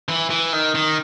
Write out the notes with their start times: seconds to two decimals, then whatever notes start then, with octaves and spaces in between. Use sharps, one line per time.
0.09 E3
0.30 E3
0.53 D#3
0.75 D#3